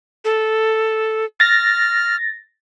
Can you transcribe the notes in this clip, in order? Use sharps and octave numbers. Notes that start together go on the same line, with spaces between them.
A4
F6 A6 A#6